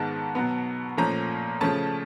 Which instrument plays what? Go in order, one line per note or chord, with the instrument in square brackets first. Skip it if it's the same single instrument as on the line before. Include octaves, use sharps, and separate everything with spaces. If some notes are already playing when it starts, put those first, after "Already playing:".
Already playing: [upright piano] G#2 D#3 G#3 B3 A5
B2 F#3 B3
A#2 F3 A3 C#4 A#5
C#3 F3 A3 C#4 A5